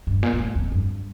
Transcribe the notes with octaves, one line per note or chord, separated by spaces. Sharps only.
G2
A#2
A#2
A2
F2
G2